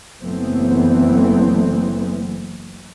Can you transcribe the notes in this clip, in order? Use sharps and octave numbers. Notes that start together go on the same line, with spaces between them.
F#1 E3 A3 B3 C4